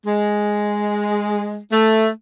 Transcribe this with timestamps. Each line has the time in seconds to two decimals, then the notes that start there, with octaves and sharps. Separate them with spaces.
0.06 G#3
1.72 A3